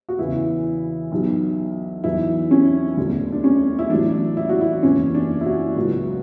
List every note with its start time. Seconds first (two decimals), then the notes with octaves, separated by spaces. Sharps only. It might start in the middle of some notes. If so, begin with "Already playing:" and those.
0.09 F#4
0.19 E2 C#3 E3 E4
1.12 B1 B2 F#3
2.04 E2 B2 F#3 E4
2.51 C#4
2.97 E1 D2 D3 F#3
3.33 D4
3.44 C#4
3.79 E4
3.90 A1 A2 F#3 D4
4.37 E4
4.49 F#4
4.61 E4
4.83 F#1 E2 B2 C#4
5.15 D4
5.41 E4
5.46 F#4
5.76 C#2 B2 F#3